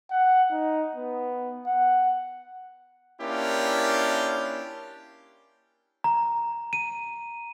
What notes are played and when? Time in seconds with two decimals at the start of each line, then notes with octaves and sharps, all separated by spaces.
0.11 F#5
0.51 D#4
0.96 B3
1.67 F#5
3.20 A#3 C#4 D4 E4 F4 G4
6.04 A#5
6.73 D#7